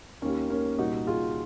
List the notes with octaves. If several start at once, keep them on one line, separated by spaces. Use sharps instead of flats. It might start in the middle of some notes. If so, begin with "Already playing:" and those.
D#2 D#3 A#3 C#4
A#3 C#4
C2 A#2 D#4 F#4
F4 G#4